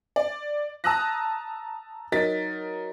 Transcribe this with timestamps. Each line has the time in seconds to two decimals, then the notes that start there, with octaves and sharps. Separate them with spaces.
0.16 D5
0.84 A5 A#5 D#6 E6 F#6 A#6
2.12 F#3 D#4 A#4 A6 B6